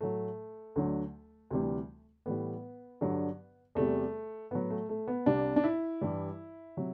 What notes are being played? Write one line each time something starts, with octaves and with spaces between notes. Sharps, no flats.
A2 F#3 A3
D2 D3 F#3
D2 C3 E3 G3
A2 E3 G3 B3
G2 D3 F#3
E2 C3 G3 A3
A2 F#3 B3
A3
A3
B3
C2 C3 G3 D4
D4
E4
G2 E3 G3
C3 F#3